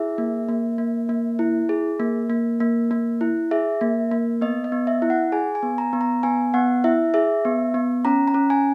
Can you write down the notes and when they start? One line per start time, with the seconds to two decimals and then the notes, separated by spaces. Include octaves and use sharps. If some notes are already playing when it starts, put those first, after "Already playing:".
Already playing: E4 G#4 E5
0.18 A#3
0.49 A#3
0.78 A#3
1.09 A#3
1.39 E4
1.69 G#4
2.00 A#3
2.30 A#3
2.60 A#3
2.91 A#3
3.21 E4
3.51 G#4 E5
3.81 A#3
4.11 A#3
4.41 B3 D#5
4.64 D#5
4.72 B3
4.87 E5
5.02 E4
5.10 F#5
5.32 G#4 G#5
5.55 G#5
5.63 B3
5.78 A#5
5.93 B3
6.01 A#5
6.23 B3 G#5
6.54 B3 F#5
6.84 E4 E5
7.14 G#4 E5
7.45 B3
7.74 B3
8.05 C#4 A#5
8.28 A#5
8.34 C#4
8.50 G#5